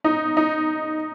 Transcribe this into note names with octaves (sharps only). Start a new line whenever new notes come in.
D#4
D#4